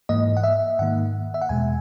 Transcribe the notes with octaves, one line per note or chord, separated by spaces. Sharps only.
G#2 E3 A#3 D#5
F#5
E5
G#2 D#3 A#3 F#5
E5
F#5
E2 B2 G#3 G#5